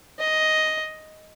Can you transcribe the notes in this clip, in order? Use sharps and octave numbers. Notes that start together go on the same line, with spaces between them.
D#5